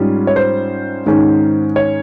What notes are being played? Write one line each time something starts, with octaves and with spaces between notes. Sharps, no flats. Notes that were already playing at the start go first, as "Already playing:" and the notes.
Already playing: G#2 G3 C#4 F4
C#5
C5
G#2 D#3 G#3 C#4
C#5